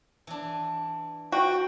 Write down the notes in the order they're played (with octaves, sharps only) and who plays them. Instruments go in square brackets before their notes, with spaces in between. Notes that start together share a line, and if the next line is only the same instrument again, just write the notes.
[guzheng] E3 D4
[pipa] F#4 [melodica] G5